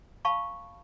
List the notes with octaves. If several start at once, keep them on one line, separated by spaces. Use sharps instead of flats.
F5 A5 B5 C#6